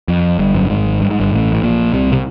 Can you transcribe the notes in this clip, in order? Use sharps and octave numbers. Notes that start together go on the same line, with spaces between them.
F2
G1 G2
F#2
G2
G#1 G#2
G2
G#2
G1 G2
A1 A2
A2
A#1 A#2
C2 C3
C3